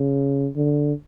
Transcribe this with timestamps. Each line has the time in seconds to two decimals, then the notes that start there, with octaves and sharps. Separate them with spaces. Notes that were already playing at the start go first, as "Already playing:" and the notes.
Already playing: C#3
0.56 D3